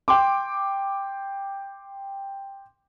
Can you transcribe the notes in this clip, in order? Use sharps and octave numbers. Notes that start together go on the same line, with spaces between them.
G5 C6 D6